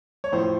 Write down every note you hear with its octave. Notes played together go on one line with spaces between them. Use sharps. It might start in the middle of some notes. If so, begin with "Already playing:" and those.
C#5
A1 A2 F3 C5